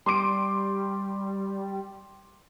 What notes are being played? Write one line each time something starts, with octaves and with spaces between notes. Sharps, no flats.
G3 C6 D6 D7